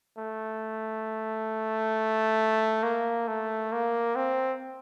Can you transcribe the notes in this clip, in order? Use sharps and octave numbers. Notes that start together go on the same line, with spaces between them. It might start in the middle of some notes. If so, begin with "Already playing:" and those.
A3
A#3
A3
A#3
C4